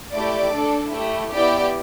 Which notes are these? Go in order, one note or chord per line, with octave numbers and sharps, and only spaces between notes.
A3 E4 G4 D5
D4 A4
A3 E4 G4
B3 E4 G4 D5 G5